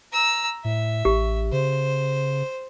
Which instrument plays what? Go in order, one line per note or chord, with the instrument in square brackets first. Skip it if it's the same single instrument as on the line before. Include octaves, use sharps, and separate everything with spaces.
[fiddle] A#5 E6
[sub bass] A2 [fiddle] E5
[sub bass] A1 [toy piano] G4
[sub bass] C#3 [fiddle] C5